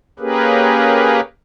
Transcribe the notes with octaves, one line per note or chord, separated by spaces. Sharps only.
A#3 C#4 G4 G#4 A#4 B4